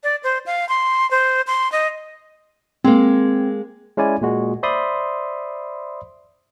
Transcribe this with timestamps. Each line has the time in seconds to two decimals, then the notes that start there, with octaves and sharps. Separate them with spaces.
0.03 D5
0.24 C5
0.46 F5
0.69 C6
1.11 C5
1.47 C6
1.72 D#5
2.84 G#3 A#3 C4
3.97 G#3 C#4 E4 D5 G#5
4.21 A#2 G#3 F#4
4.63 C5 D5 E5 B5 C6 D#6